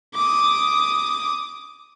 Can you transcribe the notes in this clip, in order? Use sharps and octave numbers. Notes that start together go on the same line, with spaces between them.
D6 D#6